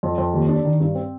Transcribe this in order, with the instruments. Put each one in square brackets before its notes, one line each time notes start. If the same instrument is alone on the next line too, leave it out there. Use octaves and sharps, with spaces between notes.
[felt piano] F2
F2
D#2
D4
D#3
G2
C4